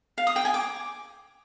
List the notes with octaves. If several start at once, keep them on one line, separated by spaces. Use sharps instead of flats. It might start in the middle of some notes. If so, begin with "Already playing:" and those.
F5
D#6
G5
G#5
D6